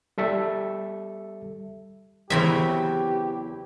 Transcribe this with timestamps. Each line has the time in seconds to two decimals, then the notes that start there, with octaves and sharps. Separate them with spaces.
0.18 G3 A4 E5
2.30 E2 C#3 E3 F#3 C4 G4 E5